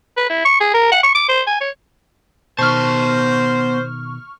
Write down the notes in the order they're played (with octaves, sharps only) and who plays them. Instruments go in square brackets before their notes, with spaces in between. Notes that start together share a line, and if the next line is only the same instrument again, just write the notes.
[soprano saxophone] B4
E4
C#6
G#4
A#4
F#5
C#6
D6
C5
G#5
C#5
[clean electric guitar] B2 D#3 [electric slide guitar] B3 A5 [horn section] C5 [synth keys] C#6 F6